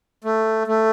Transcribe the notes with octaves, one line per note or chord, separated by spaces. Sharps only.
A3
A3